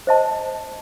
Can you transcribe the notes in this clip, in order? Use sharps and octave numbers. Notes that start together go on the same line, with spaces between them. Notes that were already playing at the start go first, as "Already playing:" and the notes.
C5 D#5 A5